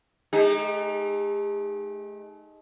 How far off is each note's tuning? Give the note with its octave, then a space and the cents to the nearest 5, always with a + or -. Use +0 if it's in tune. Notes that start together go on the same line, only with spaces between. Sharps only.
A3 -35 D#4 +0 G#4 -45